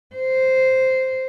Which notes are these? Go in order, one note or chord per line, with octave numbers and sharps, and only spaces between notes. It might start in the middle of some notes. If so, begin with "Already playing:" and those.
C5